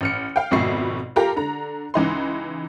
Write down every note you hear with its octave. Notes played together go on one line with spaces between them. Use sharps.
A1 F6 C#7
F5 G5
G#1 F2 B2 E5 C#6 C7
F4 G4 A4 A#4 A#5
D3 A#5
C#2 E3 D#4 C6